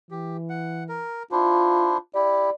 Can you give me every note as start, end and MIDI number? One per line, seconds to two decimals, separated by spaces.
0.11 1.03 52
0.11 0.37 67
0.50 0.84 78
0.89 1.23 70
1.32 1.98 62
1.32 1.98 64
1.32 1.97 65
1.32 1.98 72
2.15 2.50 64
2.15 2.50 67
2.15 2.52 74